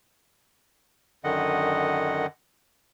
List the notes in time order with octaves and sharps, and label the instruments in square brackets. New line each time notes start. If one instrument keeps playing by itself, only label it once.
[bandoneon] F#2 D3 D#3 D#5 F#5